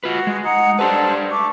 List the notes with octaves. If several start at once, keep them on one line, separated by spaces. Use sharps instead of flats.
F4 F#4 B4
G#3
D#4 F#5
D4 G4 A4 B4 C5
A3 D6